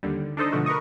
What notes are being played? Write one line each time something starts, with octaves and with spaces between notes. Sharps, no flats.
D#2 D3 G3
D4 D#4 A4 C5 D#5
B2 D3 F3 A3 F#4
A#4 B4 D#5 C#6 D#6